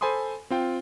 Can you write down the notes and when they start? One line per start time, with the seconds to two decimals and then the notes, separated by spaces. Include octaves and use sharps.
0.01 A4 C5 G#5 B5 C6 D#6
0.50 C4 F4 G5